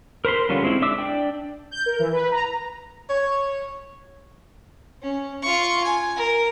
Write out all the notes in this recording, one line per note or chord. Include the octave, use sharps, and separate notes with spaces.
A#4 C5 B5 C6
D3 G3 C#4 F4
G#3 C4 E4
D4 E5 D6 E6
D4 D5 G5
G6
A#4
E3
B4
A#5
C#5
C#4
F4 C#6
G#5
A#4